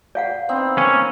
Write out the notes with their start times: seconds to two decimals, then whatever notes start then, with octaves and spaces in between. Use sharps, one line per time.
0.15 D5 F5 F#5
0.49 B3 C4 D#4
0.78 A#3 C#4